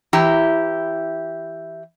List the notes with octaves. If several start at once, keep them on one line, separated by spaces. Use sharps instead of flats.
E3 E4 G4 A#5